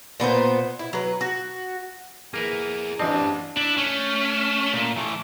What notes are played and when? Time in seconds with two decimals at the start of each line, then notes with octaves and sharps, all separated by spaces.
0.20 A#2 B3 F#4 C5
0.79 E4
0.93 F#3 B4
1.21 F#4
2.34 A#3 E4 G#4 A#4 B4
3.00 A1 E3 C4 D4 G4 D#5 A5
3.57 D4 E4
3.77 A3 C#4
4.74 A#2
4.97 E3 A3